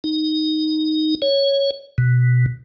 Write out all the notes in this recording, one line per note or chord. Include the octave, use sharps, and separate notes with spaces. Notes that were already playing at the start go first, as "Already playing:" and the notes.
D#4
C#5
B2